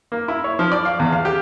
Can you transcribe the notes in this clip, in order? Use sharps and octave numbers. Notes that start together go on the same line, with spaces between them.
A#3
E4
C#5
F3
D5
F5
E2
F5
G4